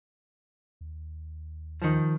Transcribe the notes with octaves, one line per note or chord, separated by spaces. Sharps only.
D#2
D#3 F3